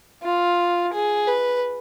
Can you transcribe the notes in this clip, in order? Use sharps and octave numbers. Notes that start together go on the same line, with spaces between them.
F4
G#4
B4